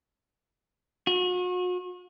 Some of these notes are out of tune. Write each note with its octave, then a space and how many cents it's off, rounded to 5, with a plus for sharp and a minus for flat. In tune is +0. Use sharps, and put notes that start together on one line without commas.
F#4 -40